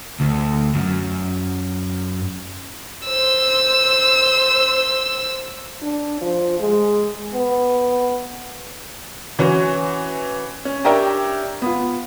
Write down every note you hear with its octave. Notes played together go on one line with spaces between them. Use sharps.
D2
F#2
C5 E6
D4
F3
G#3
B3
E3 C#4 F#4
C#4
D4 G4 A#4 C#5 E5 G5
B3 F4